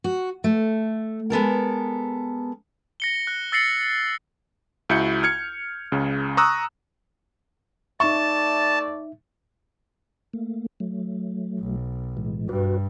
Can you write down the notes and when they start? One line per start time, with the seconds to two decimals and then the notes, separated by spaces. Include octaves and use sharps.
0.04 F#4
0.44 A3
1.30 G#3 B3 A4 A#4
3.00 A#6 C#7 G7
3.27 F#6
3.52 E6 A6 A#6 C7 C#7 F#7
4.89 C#2 E4 F#4 G6 C#7
5.23 F6 G#6 C#7
5.92 C#2 C#3
6.37 A#5 C#6 D#6 E6 F#6
8.00 A3 D#4 D5 E5 A5 C#6
10.33 A3 A#3
10.80 F#3 A3
11.59 B1
12.17 A2 E3 G#3
12.49 G2 F#4 B4